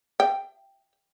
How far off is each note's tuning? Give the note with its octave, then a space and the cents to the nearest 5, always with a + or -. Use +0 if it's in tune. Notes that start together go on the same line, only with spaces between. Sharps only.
E5 +35 G5 +0